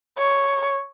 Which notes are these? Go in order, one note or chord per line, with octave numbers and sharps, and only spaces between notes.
C#5